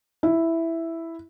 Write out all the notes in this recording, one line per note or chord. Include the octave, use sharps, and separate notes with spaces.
E4